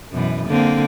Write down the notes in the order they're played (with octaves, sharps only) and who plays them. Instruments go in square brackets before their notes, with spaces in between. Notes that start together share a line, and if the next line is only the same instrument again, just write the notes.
[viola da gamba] F#2 B2 E3
D3 A#3 C4